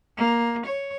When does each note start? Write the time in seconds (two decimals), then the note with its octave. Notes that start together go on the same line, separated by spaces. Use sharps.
0.17 A#3
0.66 C#5